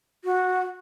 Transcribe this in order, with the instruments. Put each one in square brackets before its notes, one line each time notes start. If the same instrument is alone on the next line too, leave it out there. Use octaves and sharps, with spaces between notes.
[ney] F#4